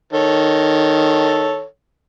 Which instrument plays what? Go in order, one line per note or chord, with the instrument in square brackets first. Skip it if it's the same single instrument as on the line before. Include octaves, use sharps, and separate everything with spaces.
[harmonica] D#3 A4 C#5